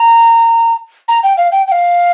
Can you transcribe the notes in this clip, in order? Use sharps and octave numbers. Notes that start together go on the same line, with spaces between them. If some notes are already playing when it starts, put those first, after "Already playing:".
Already playing: A#5
A#5
G5
F5
G5
G5
F5